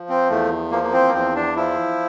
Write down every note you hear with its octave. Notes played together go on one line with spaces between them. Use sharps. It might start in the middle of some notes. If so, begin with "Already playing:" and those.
Already playing: F3
C4
E2 A3
F3 A#3
A#3
C4
A#3
E2 C4
D4
F3 E4